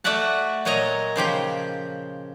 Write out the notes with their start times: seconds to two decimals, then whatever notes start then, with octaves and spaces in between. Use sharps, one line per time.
0.04 A3 F#4 D5 E5 F#5 A5
0.65 A#2 F#3 C#5 D#5 A#5
1.16 C#3 F3 G4 G5